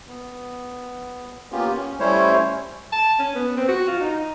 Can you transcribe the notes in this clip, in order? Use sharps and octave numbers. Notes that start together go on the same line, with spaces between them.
B3
A#3 B3 C#4 F4 G4
C#4
G3 A3 C#4 E4 C5 C#5
A5
C#4
B3
C4
F#4
F4
D#4